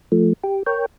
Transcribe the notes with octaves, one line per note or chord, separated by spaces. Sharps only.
F3 A3
G4
A#4 C#5 G5